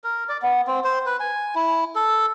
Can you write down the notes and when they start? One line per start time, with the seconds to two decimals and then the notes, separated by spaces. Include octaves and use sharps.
0.04 A#4
0.29 D5
0.42 B3
0.67 C4
0.84 C5
1.06 B4
1.20 G#5
1.55 E4
1.95 A4